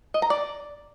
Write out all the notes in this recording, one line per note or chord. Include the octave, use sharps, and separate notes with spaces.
D#5
A#5
D5